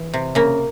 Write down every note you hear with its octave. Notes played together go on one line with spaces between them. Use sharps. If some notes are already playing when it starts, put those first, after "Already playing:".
Already playing: E3
C3
C#3 A#3